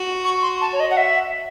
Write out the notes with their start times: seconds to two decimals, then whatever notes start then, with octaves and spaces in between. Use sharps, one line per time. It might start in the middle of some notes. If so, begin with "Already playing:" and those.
Already playing: F#4
0.24 C#6
0.42 C6
0.61 A5
0.73 C#5
0.80 D#5
0.91 F#5
0.97 E5